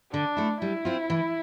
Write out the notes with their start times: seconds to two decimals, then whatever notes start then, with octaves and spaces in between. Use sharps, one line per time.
0.13 D3 D4
0.37 A3 E4
0.61 G3 E4
0.85 C4 F4
1.10 E3